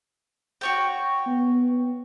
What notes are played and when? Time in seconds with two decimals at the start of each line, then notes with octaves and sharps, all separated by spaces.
0.61 F#4 C#5 G5
1.27 B3